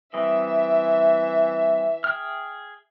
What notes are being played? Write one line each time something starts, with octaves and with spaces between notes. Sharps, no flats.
E3 G3 C4 D#5 E5
G#4 G5 F6